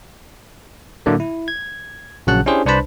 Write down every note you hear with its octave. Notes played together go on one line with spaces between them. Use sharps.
A2 D3 F#3 A3 A#3
E4
G#6
A#1 C#3 F#3 F#5 A5 F#6
C#4 D4 E4 G4 G#4 C5
C2 D4 B4 C5 A5 B5